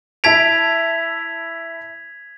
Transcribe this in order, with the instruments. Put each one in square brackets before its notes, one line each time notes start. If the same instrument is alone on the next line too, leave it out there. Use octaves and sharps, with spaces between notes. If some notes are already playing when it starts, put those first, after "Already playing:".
[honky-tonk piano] E4 A5 D7 [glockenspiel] G#6 B6 F7